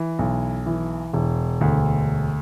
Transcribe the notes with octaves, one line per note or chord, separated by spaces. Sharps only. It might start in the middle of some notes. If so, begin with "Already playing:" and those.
Already playing: E3
B1
E3
E1
D2